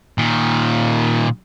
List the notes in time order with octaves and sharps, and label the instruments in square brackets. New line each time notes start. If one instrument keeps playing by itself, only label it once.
[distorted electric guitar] A#2 D#3